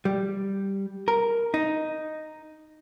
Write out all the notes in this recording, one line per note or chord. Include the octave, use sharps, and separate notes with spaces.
G3
A#4
D#4